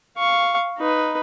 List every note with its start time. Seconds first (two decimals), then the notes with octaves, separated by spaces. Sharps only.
0.17 F5 C#6
0.78 D#4 B4